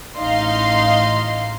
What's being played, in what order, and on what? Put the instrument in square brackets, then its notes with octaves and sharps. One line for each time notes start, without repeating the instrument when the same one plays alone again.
[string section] A1 D#4 D#5 F5 C6